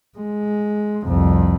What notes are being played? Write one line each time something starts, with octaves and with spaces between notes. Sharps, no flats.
G#3
C2 F2